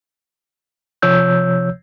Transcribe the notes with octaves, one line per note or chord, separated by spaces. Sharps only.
C3 F3 C#5 E6 G6